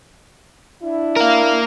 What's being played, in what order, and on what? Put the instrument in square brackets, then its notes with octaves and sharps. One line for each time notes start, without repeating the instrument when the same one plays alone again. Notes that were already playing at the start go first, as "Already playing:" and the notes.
[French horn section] D4 E4
[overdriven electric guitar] A#4 F5